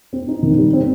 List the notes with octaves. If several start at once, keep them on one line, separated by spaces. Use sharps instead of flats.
C4
D#4
D#3
G3
C4